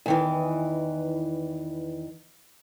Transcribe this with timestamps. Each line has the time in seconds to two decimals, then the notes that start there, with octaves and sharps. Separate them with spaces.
0.06 E2 D#3 E3